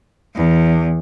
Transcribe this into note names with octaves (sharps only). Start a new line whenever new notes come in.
E2